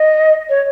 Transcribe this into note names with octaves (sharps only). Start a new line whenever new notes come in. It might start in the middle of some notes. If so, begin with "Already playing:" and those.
Already playing: D#5
C#5